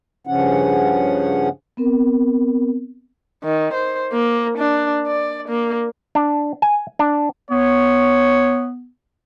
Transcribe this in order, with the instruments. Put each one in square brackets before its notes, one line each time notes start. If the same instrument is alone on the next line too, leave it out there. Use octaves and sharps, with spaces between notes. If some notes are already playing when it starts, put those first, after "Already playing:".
[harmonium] G2 C#3 F3 C#4 F#5
[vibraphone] B3 C4 A#4
[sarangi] D#3
C5
A#3
D4
D5
A#3
[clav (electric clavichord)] D4
G#5
D4
[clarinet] B3 [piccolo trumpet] C#5